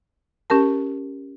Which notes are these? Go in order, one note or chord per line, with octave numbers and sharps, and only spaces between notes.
C#4 G4 A#4 A5